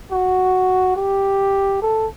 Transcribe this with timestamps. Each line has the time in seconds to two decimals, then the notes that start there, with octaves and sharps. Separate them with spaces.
0.12 F#4
0.97 G4
1.82 A4